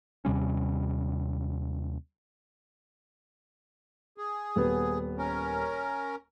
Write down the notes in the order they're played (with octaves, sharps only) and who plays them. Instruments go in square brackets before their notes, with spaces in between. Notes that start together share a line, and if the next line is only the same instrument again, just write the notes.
[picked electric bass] D#2 C3 G3 C#4
[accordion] G#4
[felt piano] D#1 B3
[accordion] C#4 A#4